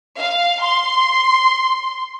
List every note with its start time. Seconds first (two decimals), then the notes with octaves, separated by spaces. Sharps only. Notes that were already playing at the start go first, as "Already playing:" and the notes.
0.17 F5
0.61 C6